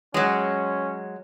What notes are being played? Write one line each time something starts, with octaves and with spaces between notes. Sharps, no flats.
F#3 G#3 C#4